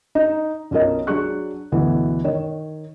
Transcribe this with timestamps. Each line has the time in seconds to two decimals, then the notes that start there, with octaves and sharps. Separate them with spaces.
0.15 D#4
0.71 B1 C#4 F4 A#4 D#5
1.07 F#3 D4 G#4 C#6 F#6
1.72 D2 B2 E3
2.24 D#3 C#5